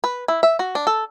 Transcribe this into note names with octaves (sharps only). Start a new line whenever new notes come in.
B4
E4
E5
F#4
D4
A4